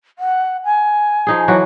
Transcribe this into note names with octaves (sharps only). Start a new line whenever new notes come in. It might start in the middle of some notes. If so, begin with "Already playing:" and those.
F#5
G#5
F3 D#4 G#4
E3 F#3 F#4